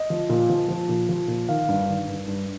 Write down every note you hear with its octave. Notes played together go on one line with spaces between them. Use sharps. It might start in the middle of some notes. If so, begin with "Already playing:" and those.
Already playing: D#5
F3
A#2
F3
F3
A#2
F3
A#2
D#3 F5
G2
D#3
G2
G2